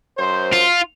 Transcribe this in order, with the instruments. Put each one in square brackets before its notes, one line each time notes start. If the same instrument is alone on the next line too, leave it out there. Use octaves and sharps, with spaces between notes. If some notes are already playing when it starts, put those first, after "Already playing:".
[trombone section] F#2 C5
[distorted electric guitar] F4